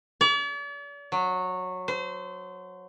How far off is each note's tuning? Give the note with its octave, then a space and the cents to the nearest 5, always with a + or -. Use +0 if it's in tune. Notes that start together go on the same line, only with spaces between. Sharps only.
D5 -45
F#3 -15
C5 -30